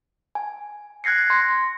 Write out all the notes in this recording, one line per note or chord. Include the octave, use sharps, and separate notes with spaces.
G#5
F#6 G#6 A#6 C7 C#7
C6 A#6